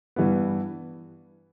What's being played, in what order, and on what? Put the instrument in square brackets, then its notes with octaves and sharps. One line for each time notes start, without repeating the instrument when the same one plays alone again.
[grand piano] G2 E3 G3 B3